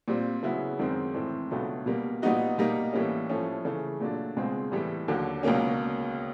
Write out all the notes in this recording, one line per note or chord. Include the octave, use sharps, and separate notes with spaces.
A#2 G3 C4
C#3 F#3 B3 E4
F#2 D#3 G#3 C4
A2 E3 G#3 C4
C#2 B2 F#3 A3 D4
B2 G3 A#3
A#2 G3 B3 D#4 F#4
B2 G3 A#3 D#4
A2 E3 G3 A#3 C#4
A2 F3 A3 C#4
C#3 E3 A3
A#2 F#3 A3 D4
C#2 B2 G#3 C4
A2 E3 G3
D#2 D3 F#3
C#2 B2 F#3 A#3 C#4